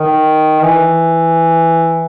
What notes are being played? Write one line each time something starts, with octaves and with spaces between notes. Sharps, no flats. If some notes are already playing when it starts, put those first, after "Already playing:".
Already playing: D#3
E3